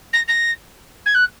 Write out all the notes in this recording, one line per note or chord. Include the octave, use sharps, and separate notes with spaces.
A#6
A#6
G#6
F#6